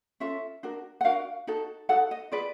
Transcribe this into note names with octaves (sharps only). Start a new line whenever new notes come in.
C#4 F4 A4 E5
D4 F#4 A#4
F#5
D4 F#4 A#4 F5
D#4 F#4 A4
D#4 F#4 A4 F#5
D#5
F4 G#4 B4 D5